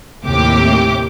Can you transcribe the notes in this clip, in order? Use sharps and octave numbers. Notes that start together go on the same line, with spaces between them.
D#2 A2 C3 G4 D6